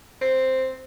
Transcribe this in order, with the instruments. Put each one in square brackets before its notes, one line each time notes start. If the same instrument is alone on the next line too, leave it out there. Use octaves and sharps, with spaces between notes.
[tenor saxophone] C4